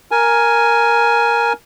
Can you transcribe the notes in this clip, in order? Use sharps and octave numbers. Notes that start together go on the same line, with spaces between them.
A#4 G#5